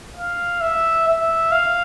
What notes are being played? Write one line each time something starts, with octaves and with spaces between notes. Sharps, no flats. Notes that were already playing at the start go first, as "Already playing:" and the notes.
F5
E5
E5
F5